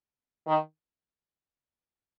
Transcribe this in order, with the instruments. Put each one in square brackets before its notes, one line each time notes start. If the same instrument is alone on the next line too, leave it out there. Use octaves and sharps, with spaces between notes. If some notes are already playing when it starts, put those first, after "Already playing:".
[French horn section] D#3